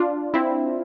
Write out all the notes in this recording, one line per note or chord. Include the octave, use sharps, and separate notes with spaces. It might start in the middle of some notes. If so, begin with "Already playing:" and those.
Already playing: D4 F4
C4 E4